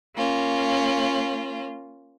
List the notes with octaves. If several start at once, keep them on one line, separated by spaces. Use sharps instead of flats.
A#3 C#4 F4